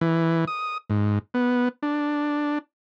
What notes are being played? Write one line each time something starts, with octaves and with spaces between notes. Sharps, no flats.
E3
D#6
G#2
B3
D4